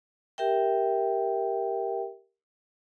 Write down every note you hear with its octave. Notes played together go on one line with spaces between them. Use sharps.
G4 A#4 E5 G5